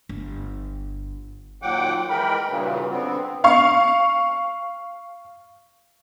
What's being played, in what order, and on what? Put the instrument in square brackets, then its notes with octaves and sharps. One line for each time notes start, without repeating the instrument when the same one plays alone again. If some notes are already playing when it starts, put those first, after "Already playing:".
[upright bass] G1
[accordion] D#2 A#2 F#3 F#5 G5 D6
E3 G#3 A#4 G5 B5
G2 A#2 C#3 E3 F#3
D3 B3 C4
[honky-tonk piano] F5 C#6